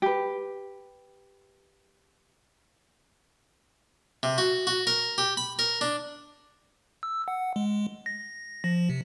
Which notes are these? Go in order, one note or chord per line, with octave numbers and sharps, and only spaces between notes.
G4 B4
C3
F#4
F#4
A#4
G4
B5
A#4
D4
E6
F#5
G#3
A#6
F3
C3